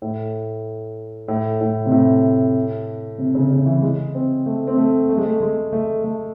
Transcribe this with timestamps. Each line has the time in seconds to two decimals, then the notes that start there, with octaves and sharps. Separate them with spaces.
0.02 A2
1.28 A2
1.61 A2
1.86 C3
1.92 A2
3.18 C3
3.35 C#3
3.51 C#3
3.66 E3
3.82 G#3
4.15 C4
4.46 A3
4.67 C4
4.77 A3
5.09 A3
5.17 G#3
5.26 A3
5.40 G#3
5.72 A3
6.04 A3